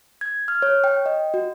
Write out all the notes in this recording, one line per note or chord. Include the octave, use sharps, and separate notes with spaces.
G#6
F6
C#5
G5
D#5
F#4